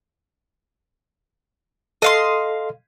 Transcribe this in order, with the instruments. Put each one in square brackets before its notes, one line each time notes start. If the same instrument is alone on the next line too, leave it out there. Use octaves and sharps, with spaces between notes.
[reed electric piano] A4 [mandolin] D#5 F5 C6